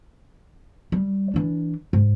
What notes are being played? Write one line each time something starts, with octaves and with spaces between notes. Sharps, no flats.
G3
E3 D4
G#2